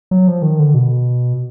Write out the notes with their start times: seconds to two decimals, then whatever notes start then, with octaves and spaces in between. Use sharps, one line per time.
0.11 F#3
0.28 F3
0.42 D#3
0.59 D3
0.74 B2